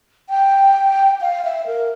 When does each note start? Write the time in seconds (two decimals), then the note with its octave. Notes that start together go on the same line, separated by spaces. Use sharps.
0.29 G5
1.21 F5
1.45 E5
1.67 A#4